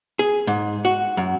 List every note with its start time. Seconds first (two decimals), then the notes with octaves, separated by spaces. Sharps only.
0.19 G#4
0.47 G#2
0.85 F#4
1.17 F#2